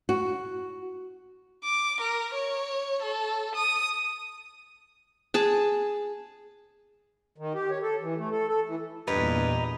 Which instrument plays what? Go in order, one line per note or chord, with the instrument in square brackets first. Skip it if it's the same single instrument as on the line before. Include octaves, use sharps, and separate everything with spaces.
[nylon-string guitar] F#4
[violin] D6
A#4
C#5
A4
D#6
[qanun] G#4 A5
[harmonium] D#3
G4
C#5
A4
E3
A3
A4
A4
E3
[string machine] E2 A#2 [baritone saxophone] G2 [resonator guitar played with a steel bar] B4 [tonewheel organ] D#5 A#5